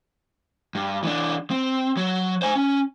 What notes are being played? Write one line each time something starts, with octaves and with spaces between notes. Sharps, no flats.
G2
E3 D4
C4
F#3
C5 G#5
C#4